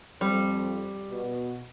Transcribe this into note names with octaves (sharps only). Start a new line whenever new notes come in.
F2 G3 C4
B2